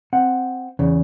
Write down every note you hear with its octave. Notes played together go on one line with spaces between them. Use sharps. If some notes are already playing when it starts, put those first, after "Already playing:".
C4 F#5
E2 C#3